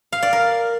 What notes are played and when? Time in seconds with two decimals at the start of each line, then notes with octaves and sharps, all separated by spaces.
0.13 F5
0.23 D5
0.33 A#4